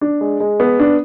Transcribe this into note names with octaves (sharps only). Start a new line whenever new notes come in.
D4
G#3
G#3
B3
D4